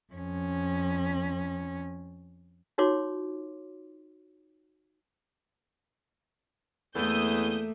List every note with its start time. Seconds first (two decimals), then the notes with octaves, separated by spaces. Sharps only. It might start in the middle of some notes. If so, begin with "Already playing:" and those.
0.13 F2 C#4
2.78 D#4 F4 F#4 C#5 C6 D6
6.95 E2 A3 A#3 E4 A4 D#6 G6